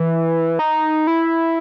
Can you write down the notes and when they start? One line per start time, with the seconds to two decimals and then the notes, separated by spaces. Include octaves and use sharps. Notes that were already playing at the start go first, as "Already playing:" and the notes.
Already playing: E3
0.59 D#4
1.07 E4